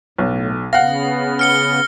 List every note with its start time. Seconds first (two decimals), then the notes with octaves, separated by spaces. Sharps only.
0.18 B1 A2
0.73 C#3 B3 F5 F#5 A#6
1.39 F6 C#7 G7